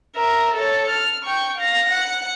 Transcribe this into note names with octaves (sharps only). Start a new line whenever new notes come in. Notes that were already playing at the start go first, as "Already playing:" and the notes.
A#4 E5
A4 C#5
F6
G5 C#6
F5 A#6
F#5